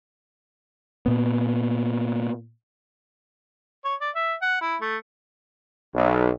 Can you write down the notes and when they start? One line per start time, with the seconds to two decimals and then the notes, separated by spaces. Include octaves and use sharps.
1.06 A#2 B3
3.85 C#5
4.01 D5
4.15 E5
4.42 F#5
4.61 E4
4.81 A3
5.94 B1